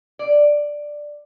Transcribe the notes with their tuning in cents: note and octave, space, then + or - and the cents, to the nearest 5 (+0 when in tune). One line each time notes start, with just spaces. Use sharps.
D5 +5